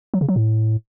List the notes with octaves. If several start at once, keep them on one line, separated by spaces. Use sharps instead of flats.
F#3
C#3
F#3
A2